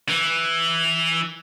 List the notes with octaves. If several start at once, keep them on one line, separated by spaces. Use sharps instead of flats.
E3